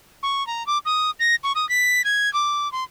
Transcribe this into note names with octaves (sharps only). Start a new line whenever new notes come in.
C#6
A#5
D6
D#6
A#6
C#6
D#6
B6
G#6
D6
C6